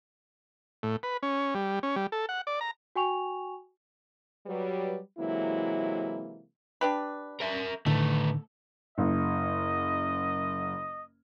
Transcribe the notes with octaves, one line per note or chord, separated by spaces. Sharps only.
A2
B4
C#4
G3
C#4
G3
A4
F#5
D5
A#5
F#4 G5 G#5 C#6 F7
F#3 G3 B4
C3 E3 F#3 G#3 A#3 E4
D4 G4 B4
A#4 E5
A2 D3 D#3 A3 B3 A4
F#1 D#5